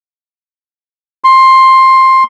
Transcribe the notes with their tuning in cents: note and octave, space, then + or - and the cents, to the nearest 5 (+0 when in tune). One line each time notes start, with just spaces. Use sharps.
C6 +10